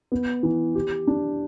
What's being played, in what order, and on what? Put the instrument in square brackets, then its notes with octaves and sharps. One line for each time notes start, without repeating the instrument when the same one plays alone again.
[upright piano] B3
E3
G4
D4